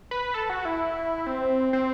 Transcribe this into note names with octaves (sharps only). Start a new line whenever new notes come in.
B4
A4
F#4
E4
C4
C4